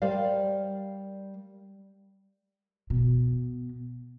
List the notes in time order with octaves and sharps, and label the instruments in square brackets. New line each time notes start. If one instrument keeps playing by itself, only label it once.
[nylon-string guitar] G3 A#4 C5 D5 F5
[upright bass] B2